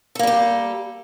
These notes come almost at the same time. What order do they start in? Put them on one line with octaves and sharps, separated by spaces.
A4 A#3 G3 G4